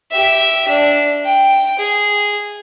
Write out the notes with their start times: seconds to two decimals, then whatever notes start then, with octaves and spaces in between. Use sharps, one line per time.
0.12 G4 E5
0.69 D4
1.26 G5
1.79 G#4